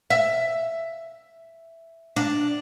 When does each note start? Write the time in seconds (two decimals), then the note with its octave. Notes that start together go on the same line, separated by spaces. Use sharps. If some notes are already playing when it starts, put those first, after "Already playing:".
0.10 E5
2.16 D4